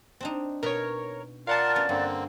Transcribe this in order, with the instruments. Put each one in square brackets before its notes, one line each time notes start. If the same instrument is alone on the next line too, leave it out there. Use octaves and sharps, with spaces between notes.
[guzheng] C4 D4 D#4
[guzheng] B2 B4 [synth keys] A#4 C#5
[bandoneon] F4 A#4 [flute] D5 [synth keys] F5 F#5 A5
[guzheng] B3 C#4
[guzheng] G2 [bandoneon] D3 A#3 C4